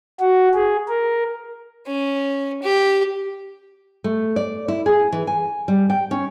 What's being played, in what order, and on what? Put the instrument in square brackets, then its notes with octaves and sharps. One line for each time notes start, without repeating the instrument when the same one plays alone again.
[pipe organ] F#4
G#4
A#4
[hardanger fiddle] C#4
G4
[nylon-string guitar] A3
D5
E4
G#4
E3
G#5
G3
G5
C#4